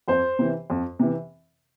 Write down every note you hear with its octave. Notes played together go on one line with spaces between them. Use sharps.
F2 C5
C3 E3
F2
C3 E3